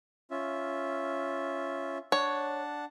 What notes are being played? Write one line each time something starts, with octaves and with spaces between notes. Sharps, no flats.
C#4 F4 E5
D4 C#5 F#5 A5